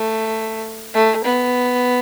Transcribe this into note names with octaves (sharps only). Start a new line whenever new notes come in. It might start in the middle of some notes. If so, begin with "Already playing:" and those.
Already playing: A3
A3
B3